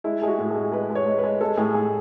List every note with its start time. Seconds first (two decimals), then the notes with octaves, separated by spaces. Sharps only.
0.04 G#3 E4
0.22 G#3 G#4
0.28 F#4
0.39 A2
0.51 G#4
0.56 G#3
0.72 G#3 B4
0.90 G#3
0.95 C#5
1.06 G#3
1.18 B4
1.24 G#3
1.41 G#3 A4
1.57 A2 G#4
1.74 A2 G#4